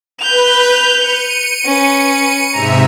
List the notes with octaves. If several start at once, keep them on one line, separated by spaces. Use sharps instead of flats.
B4 G6 F7
C#7 D#7
C#4 B4
G#2 C3 E5 A#5